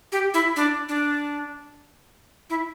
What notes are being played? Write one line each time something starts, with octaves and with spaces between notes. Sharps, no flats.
G4
E4
D4
D4
E4